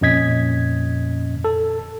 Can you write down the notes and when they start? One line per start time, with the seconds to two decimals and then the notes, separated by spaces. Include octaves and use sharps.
0.01 F2 A#2 C#4 D#5 G#6 B6
1.44 A4